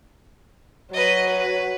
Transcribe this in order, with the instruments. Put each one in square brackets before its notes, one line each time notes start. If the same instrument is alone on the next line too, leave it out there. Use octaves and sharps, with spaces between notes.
[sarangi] F#3 [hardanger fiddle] B4 D#5
[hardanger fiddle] B4